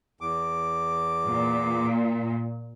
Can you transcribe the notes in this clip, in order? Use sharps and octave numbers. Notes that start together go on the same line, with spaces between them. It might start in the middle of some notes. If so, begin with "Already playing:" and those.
E2 D6
A#2